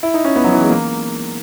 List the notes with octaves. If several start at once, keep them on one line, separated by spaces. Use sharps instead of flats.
E4
D#4
C#4
B3
F#3
E3
G#3
A#3